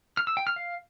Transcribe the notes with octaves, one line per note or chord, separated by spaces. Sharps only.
F6
E6
G5
F6
F5